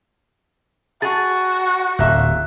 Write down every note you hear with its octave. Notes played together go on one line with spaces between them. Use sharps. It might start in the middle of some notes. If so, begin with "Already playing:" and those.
F#4 G#4 A6
D1 A#2 E5 F#6